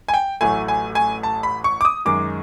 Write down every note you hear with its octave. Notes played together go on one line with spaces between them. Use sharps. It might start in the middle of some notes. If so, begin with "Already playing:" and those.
G#5
G5
A1 A2 F#3 A3 G#5
G#5
G#5
A5
B5
C#6
D6
D#6
F#2 D#3 G#3 D6